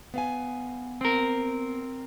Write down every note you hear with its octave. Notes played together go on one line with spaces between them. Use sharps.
B3 F5 G#5
C4 A#4